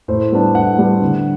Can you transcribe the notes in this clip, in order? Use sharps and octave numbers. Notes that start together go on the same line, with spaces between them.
A2 C5
G3 B3 D4
A2 F#5
G3 B3 D4
D3